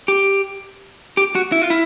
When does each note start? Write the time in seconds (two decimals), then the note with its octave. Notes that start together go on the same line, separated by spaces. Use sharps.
0.08 G4
1.17 G4
1.35 F#4
1.52 E4
1.62 F4
1.70 E4